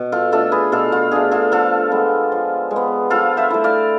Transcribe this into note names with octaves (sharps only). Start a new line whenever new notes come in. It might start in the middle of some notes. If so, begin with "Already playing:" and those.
Already playing: B2
F4 A4
A3 D4 F4 A4
G#4 B4
B2 F4 A4
F4
A3 D4 G#4
F4 A4
F3 F4 A4
G#3 B3
F3
G#3
B3
F3 F4 A4
C5 E5
A3 E4
D5 F5